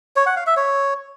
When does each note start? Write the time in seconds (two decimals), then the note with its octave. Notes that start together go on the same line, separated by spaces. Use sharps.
0.16 C#5
0.26 F#5
0.36 F5
0.47 E5
0.57 C#5